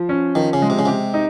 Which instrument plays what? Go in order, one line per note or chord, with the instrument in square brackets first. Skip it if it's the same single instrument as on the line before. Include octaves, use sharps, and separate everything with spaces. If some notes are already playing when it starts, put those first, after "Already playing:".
Already playing: [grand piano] F3
C#4
[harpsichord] D#3 [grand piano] F3
[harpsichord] C#3
[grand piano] G#3
[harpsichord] C3
C#3
[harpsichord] C3 [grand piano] G4
[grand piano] D#4